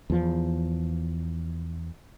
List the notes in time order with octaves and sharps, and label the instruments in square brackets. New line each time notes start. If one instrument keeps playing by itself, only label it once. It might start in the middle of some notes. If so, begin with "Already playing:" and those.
[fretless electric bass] E2 F3